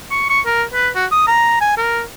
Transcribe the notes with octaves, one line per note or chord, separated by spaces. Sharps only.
C#6
C#6
A#4
B4
F#4
D#6
A#5
G#5
A#4